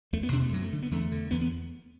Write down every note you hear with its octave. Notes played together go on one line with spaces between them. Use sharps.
E2 A3
B3
B2 D4
A3
F#2 F#3
A3
D3
B3
E2 A3
D3
E2 B3
B3